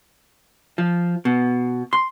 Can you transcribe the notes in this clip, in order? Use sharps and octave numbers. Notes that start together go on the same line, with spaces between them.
F3
B2
C6